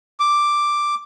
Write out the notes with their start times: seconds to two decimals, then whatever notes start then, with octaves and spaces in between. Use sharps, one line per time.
0.20 D6